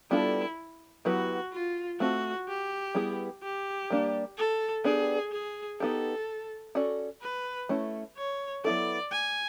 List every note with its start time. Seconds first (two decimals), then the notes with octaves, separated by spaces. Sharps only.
0.11 G3 B3 D4 E4 F4 A4
1.05 F#3 B3 E4 F#4 G4 B4
1.53 F4
2.00 A3 C4 F4 F#4
2.48 G4
2.95 G3 B3 E4 G#4
3.43 G4
3.90 G3 A#3 D4
4.38 A4
4.84 B3 D4 G4 G#4
5.32 G#4
5.80 B3 D#4 G4 A4
6.75 C#4 F#4 A4 D5
7.22 B4
7.69 A3 C#4 E4
8.17 C#5
8.65 F#3 B3 E4 A4 D5
9.12 G#5